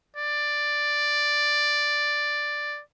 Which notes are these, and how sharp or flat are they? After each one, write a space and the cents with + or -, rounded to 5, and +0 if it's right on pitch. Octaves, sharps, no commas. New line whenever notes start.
D5 +5